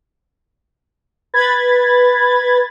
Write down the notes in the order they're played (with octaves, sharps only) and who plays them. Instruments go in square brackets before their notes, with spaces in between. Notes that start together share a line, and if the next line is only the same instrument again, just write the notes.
[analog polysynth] B4 B5 G#6 A6